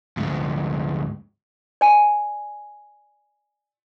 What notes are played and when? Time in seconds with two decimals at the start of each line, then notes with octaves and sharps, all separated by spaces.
0.17 D2 G#2
1.81 D5 G#5